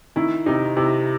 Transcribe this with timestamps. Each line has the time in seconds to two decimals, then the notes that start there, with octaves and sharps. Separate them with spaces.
0.16 D#3 E4
0.46 C3 D#4
0.76 C3 E4